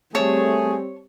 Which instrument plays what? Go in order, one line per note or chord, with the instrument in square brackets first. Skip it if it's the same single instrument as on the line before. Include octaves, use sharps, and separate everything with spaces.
[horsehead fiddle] G3 C4 [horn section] A3 G#4 [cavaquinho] C#5 A5